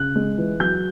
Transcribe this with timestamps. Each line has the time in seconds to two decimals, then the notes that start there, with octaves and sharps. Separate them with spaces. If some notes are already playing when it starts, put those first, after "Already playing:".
Already playing: C#3 F#6
0.15 G#3
0.38 E3
0.60 F#3 G6